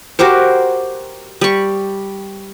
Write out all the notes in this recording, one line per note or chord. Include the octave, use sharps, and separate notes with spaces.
F#4 G4 A#4 C5
G3 C#6